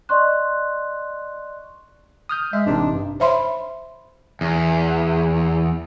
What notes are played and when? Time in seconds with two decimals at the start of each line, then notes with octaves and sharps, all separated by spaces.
0.09 D5 D#5 C6 C#6 F#6
2.29 D#6 F6 G6
2.53 G#3 E5
2.66 A1 C3 D4 D#4
2.91 G2
3.20 C5 C#5 E5 B5 C6
4.41 E2